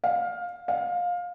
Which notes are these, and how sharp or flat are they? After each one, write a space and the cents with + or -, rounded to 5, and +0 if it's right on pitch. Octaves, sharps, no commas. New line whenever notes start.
F5 +15
F5 +20